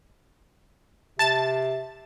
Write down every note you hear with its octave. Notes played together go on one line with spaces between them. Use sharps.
C3 A5 A6